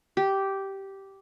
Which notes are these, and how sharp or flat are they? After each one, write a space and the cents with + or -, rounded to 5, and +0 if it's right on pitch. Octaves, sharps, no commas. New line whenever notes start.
G4 -10